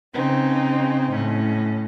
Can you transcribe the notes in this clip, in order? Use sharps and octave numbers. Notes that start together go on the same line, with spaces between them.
C#3 C4 D#4
A2 C#4